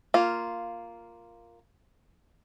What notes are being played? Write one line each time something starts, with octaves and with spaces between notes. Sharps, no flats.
A#3 F4